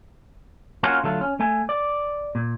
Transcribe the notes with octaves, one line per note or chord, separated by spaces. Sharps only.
A#3 C#4 F4 F#4
D3 F#3 A3 F4
C#4
A3 G#5
D5
A#2